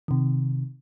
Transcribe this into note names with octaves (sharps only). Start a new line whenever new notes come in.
C3 D#3